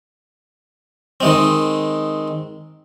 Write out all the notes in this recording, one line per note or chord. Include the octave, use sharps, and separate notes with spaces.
D#3 G#3 C4